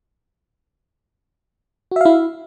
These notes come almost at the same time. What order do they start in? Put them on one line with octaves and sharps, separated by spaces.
F#4 E5 F5 E4